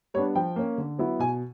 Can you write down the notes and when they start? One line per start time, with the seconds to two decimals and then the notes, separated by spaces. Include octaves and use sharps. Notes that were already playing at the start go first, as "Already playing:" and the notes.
0.14 G3 B3 D4 C#5
0.35 F3 G5
0.56 A#3 C#4
0.78 D3
0.99 F#3 B3 E4
1.19 B2 G#5